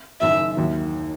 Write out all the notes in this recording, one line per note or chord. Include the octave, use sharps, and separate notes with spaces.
F#1 F#2 D#3 E5
D#2 D#3 F#3